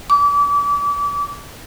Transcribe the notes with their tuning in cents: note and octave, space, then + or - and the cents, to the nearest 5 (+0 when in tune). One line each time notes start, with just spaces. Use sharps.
D6 -35